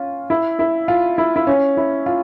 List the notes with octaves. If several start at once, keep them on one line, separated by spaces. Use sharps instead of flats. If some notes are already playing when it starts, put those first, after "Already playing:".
Already playing: C#4 F4
E4
E4
F4
E4
E4
C#4
E4
F4